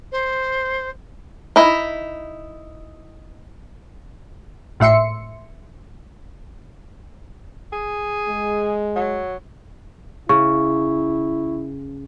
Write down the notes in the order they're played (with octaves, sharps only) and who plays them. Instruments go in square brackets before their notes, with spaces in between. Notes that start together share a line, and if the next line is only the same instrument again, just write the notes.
[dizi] C5
[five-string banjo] D#4 E4
[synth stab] G#1 A2 E5 C6 C#7
[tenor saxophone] G#4
[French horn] G#3
[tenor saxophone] F#3
[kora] C#3 [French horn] E4 [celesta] C#6